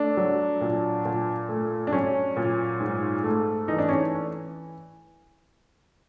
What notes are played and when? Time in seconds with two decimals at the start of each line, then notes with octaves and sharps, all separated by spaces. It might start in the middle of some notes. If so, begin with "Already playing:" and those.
Already playing: A3 D4
0.17 F#3
0.61 A#2
1.05 A#2
1.49 A3
1.87 D4
1.93 F#3 C#4
2.36 A#2
2.81 G#2
3.24 A3
3.68 E3 D#4
3.78 D4
3.89 C#4